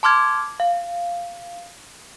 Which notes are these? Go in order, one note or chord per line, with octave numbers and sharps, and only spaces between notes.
A5 C6 D6 F6 G#6
F5